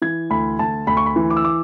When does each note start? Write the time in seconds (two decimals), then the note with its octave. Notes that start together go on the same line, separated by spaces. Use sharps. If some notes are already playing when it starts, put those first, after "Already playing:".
0.02 E3 G#6
0.30 D2 B5
0.59 D2 A5
0.87 D2 B5
0.97 C#6
1.06 B5
1.16 E3
1.30 D6
1.37 E6
1.44 D6